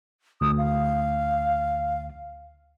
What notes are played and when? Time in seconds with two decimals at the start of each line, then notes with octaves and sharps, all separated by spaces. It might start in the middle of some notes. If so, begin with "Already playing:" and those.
0.41 D2 D#6
0.58 F5